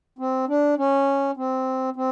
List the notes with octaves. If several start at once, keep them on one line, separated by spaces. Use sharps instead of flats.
C4
D4
C#4
C4
C4